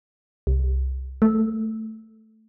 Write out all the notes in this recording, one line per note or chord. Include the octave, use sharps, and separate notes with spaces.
C2
A3